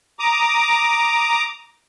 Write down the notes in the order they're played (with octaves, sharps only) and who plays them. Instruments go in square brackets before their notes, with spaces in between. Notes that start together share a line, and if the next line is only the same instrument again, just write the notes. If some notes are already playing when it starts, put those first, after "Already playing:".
[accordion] A#5 D6 D#6